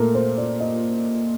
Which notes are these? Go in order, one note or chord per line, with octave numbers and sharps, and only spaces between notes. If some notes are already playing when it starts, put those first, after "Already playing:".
Already playing: A#2 A3 A#4
C5
D5
D#5